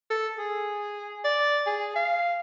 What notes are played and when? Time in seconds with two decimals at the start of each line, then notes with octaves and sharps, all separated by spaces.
0.10 A4
0.39 G#4
1.25 D5
1.67 G#4
1.96 F5